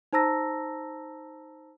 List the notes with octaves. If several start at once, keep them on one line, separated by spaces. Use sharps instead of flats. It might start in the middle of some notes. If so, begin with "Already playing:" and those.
D#4 C5 A5 A#5 E6 A#6